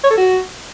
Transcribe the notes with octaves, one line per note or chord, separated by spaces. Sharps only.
C#5
A4
F#4